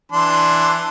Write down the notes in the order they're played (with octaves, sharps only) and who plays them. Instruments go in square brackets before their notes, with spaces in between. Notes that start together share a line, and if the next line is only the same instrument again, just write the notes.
[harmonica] E3 D4 C6